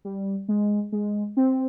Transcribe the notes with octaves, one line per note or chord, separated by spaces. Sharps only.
G3
G#3
G#3
C4